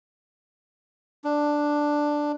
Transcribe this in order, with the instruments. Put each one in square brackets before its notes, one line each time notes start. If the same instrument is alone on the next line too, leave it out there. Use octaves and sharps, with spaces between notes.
[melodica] D4